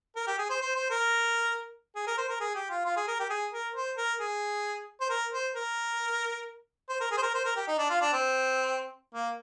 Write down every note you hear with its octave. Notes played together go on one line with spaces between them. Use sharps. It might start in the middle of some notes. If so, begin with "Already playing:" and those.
A#4
G4
G#4
C5
C5
C5
A#4
G#4
A#4
C5
A#4
G#4
G4
F4
F4
G#4
A#4
G4
G#4
A#4
C5
A#4
G#4
C5
A#4
C5
A#4
C5
A#4
G#4
C5
A#4
C5
A#4
G4
D#4
D4
F4
D4
C4
A#3